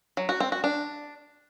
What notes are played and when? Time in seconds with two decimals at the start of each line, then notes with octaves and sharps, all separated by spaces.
0.17 F#3
0.29 F#4
0.40 C4
0.52 F#4
0.64 D4